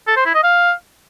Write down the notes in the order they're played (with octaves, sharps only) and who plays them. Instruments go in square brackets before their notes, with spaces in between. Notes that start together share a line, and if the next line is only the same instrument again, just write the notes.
[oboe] A4
C5
E4
D#5
F5